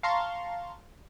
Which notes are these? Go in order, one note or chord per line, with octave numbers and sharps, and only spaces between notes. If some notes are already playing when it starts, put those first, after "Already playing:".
F5 A5 A#5 C6 C#6